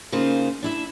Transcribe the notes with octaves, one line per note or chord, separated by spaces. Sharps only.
C#3 A#3 D#4 F4 C5
D4 E4 E5